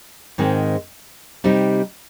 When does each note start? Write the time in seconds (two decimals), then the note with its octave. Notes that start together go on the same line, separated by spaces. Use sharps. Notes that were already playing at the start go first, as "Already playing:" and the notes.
0.38 G#2 D#3 G#3 C4
1.44 C3 G3 C4 D#4